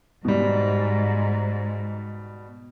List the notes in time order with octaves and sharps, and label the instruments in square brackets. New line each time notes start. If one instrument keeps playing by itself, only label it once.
[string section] G#2 [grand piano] B2 G3